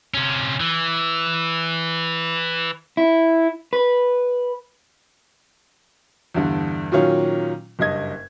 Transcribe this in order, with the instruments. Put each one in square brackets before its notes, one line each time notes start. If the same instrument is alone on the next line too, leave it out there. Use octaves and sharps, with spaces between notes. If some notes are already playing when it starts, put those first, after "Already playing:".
[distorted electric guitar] C3 C#4
E3
[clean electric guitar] E4
B4
[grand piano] E2 G2 D3
A#2 D#3 F#3 C#4 F4
F#1 G2 D#5 G#6